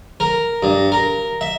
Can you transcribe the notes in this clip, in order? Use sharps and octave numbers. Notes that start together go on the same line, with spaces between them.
A#4
G2
A#4
E5